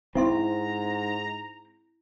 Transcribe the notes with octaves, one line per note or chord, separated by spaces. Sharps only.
G#2 C4 E4 E5 A#5 C6